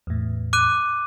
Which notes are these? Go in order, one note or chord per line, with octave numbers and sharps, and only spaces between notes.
E2 A2
D6 F#6 D#7